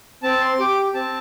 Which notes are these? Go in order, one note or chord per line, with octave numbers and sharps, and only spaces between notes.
C4 A5
C6
G4 D6
C4 A5